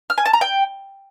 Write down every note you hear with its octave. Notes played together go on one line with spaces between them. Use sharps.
F6
G#5
A5
A#5
G5